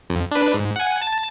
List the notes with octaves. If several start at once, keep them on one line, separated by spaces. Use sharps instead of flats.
F2
D4 B4
G#2
F#5 G#5
A5 A6